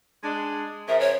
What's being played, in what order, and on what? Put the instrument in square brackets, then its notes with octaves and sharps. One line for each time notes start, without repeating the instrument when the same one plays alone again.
[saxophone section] G#3 D4
[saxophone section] C#3 F3 A#4 [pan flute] E5
[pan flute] C#5